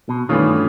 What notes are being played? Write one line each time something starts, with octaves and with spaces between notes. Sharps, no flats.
B2
G2 D#3 E3 A3 C#4 F4